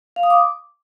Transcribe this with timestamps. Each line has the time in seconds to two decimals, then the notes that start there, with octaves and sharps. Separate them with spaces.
0.16 F5
0.23 D#6
0.30 D6